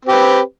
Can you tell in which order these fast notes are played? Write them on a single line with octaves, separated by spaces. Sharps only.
C4 G4 B4